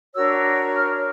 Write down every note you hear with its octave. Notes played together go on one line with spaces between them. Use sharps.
D4 F#4 A#4 C#5 E6
F6